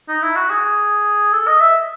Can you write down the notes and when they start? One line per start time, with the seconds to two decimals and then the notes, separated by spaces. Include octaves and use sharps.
0.08 D#4
0.22 E4
0.36 F#4
0.50 G#4
1.33 A4
1.47 D#5
1.60 E5